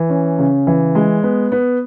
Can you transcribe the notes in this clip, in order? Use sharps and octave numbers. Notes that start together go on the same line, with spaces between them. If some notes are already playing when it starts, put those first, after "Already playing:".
Already playing: E3
C#4
C#3
E3
G#3
B3
B3